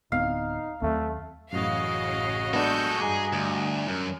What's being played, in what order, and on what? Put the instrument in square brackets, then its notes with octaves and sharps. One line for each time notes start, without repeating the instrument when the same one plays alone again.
[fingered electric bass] D1 B3 C4 [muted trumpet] D#4 [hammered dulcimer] F5
[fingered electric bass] D#2 F#3 C4 [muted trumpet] A3
[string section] A1 C#3 F5 [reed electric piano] F#2 A2 [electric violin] F#4 D#5
[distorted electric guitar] G#3 A4 [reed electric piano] B3 D4 [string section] C#6 G6
[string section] G2 [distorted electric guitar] G#4 [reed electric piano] G#5 A#5 D6
[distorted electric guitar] D2
F#2